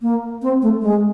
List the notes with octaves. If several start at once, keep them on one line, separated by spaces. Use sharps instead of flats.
A#3
C4
A3
G#3